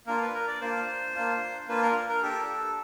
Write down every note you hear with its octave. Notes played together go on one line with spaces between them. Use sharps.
A#3 D4 F4 A#4
B4
A#4
D5
A#3 D4 F4 C5
A#3 D4 F4
A#3 D4 F4 B4
A#4
A#4
D4 G4 A4